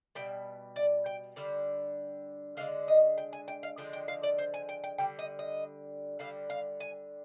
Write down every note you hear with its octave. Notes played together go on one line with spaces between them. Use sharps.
B2 G3 G5
D5
G5
D3 G3 F5
D3 G#3 F5
D#5
G5
G#5
G5
F5
D3 F3 G#3 G5
G5
F5
D5
C5
G#5
G5
G5
D3 G3 G5
D#5
D#5
D3 G3 F5
F5
G#5